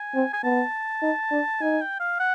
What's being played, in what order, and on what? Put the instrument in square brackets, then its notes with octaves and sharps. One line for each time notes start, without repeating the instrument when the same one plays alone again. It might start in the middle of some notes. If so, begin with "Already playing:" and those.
Already playing: [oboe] G#5
[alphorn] C4
[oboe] G#5
[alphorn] B3 [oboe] A5
[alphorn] D#4
D4
[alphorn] D#4 [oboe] G#5
[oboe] G5
F5
F#5